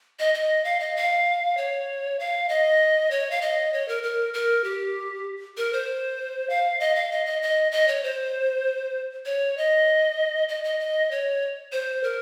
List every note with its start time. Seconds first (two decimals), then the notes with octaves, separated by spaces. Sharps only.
0.19 D#5
0.34 D#5
0.64 F5
0.80 D#5
0.96 F5
1.57 C#5
2.19 F5
2.49 D#5
3.11 C#5
3.31 F5
3.42 D#5
3.73 C#5
3.88 A#4
4.03 A#4
4.34 A#4
4.64 G4
5.57 A#4
5.73 C5
6.50 F5
6.80 D#5
6.95 F5
7.11 D#5
7.26 D#5
7.42 D#5
7.72 D#5
7.88 C#5
8.03 C5
9.26 C#5
9.57 D#5
10.49 D#5
10.64 D#5
10.80 D#5
11.11 C#5
11.72 C5
12.04 A#4